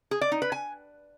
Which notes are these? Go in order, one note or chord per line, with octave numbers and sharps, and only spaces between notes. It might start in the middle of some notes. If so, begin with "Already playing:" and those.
G#4
D5
D#4
B4
G#5